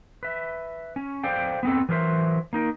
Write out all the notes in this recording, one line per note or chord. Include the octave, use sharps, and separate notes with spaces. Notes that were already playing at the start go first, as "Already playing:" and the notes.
B4 E5
C#4
A4 C5 D5 F5 G5
B3 C4 A4
E3 F#3 A#4 C5 E5
A#3 D#4 A#4